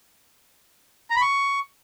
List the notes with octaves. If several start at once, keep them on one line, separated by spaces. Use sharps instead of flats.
A#5
B5
C#6